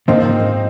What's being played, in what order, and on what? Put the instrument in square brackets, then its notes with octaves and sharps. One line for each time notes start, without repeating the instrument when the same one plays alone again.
[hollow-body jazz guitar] G#2 F3 A#3 [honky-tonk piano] C4 D#4